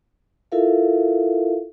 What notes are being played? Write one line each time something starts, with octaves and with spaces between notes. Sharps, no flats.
E4 F4 A4 A#4 E5 F5